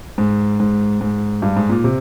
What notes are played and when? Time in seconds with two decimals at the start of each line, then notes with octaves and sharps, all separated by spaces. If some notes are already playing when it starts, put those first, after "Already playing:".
0.18 G#2
0.60 G#2
1.01 G#2
1.42 G2
1.56 G#2
1.69 A#2
1.84 C3